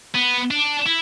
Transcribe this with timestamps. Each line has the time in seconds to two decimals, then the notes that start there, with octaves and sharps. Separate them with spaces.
0.15 B3
0.51 D4
0.86 E4